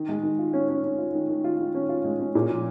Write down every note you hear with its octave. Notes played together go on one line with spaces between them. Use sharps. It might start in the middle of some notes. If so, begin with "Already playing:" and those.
Already playing: D#3
G#3
D#3
F4
C#4
C#4
C#4
F4
D#3
D#3
F4
D#3
C#4
F4
G#3
C#4
A#2
F3